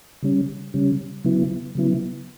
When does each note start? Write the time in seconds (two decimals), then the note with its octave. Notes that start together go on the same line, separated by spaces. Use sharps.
0.23 C#3 G3 C#4
0.74 C#3 G3 C#4
1.24 C#3 F#3 B3 E4
1.75 C#3 F#3 B3 E4